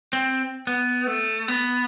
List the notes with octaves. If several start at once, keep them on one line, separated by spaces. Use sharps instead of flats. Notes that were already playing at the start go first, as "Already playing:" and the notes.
C4
B3
A3
B3